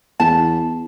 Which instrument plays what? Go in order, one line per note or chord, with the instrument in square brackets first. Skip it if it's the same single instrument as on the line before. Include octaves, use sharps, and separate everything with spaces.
[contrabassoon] E2 [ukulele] A5